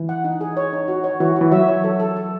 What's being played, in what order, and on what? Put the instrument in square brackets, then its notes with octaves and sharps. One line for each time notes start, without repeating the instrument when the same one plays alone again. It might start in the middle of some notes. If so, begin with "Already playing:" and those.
Already playing: [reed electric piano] E3
[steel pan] F#5
D#4
G#4
C#5
D#4
F#4
C#5
[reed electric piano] E3 [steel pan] F#4
[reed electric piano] E3 [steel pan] F#4
[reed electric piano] F#3 [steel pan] E5
[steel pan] C#5
A4
A4
A4